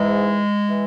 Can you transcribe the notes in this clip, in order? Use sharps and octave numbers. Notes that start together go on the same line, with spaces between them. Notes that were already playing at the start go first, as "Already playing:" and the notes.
Already playing: G#2 E3 G#3
E3